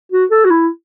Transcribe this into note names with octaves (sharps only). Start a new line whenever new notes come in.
F#4
A4
F#4
E4